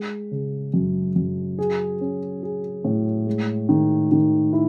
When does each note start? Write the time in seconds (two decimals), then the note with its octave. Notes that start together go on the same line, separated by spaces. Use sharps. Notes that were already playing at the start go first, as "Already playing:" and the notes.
Already playing: G#3
0.31 C#3
0.74 F#2
1.16 F#2
1.58 G#4
2.01 C#4
2.43 G#4
2.84 A2
3.27 G#3
3.69 D#3
4.12 D#3
4.53 E4